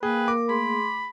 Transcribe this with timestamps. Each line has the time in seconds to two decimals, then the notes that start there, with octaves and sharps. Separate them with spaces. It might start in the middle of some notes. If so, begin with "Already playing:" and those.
0.03 A#3 G#4 B4 G5
0.28 A#4 D6
0.49 A3 G#4 B5 C6